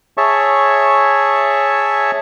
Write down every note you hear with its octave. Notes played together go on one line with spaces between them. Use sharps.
G#4 C#5 E5 A5 C#6